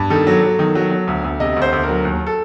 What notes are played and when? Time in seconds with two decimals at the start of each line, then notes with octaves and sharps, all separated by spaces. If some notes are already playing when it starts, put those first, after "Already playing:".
Already playing: G2
0.10 D#3 A4
0.27 F#3
0.42 F#3
0.59 D#3
0.75 F#3
0.91 F#3
1.07 D2
1.24 D2
1.40 C3 D#5
1.56 D2
1.62 C5
1.73 D2
1.83 A#4
1.89 F#3
2.05 D#2
2.27 A4